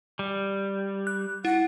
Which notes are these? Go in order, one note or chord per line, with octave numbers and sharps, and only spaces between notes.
G3
F#6
E4 F#5